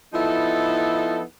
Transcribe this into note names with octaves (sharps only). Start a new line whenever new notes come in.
F3 B3 D#4 E4 A4